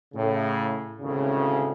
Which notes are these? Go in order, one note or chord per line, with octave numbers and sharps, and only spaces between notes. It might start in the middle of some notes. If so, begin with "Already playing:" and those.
A2 C#3
G#1 D2 A2 C#3